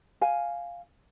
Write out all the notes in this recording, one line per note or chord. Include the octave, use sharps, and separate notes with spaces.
F5 G#5